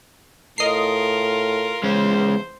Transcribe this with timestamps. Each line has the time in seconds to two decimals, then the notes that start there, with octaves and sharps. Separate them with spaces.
0.58 A2 F4 A#4 D#5 C7
1.83 E2 G#3 C#4 C5